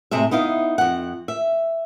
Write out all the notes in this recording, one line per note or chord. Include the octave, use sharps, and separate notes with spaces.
A2 C3 G#3 A4 E5
B3 D#4 E4 F5
F2 F#5
E5